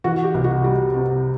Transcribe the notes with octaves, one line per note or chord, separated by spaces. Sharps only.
E3 F#4
G4
C2
F#4
G3
C3